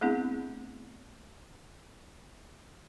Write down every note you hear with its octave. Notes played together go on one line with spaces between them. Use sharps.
A3 B3 C4 D4 E4 G#4